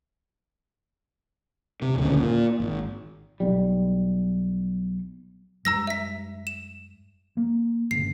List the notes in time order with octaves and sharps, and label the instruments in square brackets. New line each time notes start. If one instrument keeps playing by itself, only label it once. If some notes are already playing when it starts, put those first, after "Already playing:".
[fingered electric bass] C3
D#1 G#1 D2 C#3
A#2
G#1
[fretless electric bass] B1 G3
[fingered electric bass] F#2 G3 G#3 [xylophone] A#5 E6 A#6
[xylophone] E5 B6
E7
[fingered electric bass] A#3
[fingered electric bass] G1 A2 C#3 [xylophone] C7